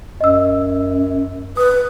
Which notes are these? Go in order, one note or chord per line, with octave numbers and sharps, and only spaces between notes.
F#2 D#5 E6
B4 D#6